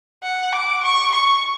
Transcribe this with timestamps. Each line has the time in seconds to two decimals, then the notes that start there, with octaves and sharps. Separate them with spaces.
0.23 F#5
0.53 D6
0.83 C#6
1.12 C#6